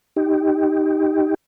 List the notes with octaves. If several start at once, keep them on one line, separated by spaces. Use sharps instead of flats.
D#4 G4